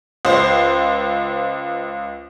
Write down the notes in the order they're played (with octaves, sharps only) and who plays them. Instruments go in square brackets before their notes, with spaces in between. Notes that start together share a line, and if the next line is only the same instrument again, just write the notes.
[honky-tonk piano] C#2 C5 C7